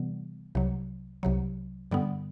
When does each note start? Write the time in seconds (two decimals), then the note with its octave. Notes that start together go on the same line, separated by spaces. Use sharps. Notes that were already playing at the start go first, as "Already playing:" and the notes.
Already playing: C3 E3 G3 B3
0.55 C2 C3 F#3
1.23 C2 C3 F#3
1.91 G2 D3 G3 B3